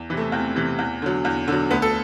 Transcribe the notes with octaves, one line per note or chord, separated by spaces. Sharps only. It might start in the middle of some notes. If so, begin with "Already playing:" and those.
Already playing: E2
C3 E3
A3
E2 C4
C3 E3
E2
D3 F#3
E2
D3 F#3
D2 B3
A4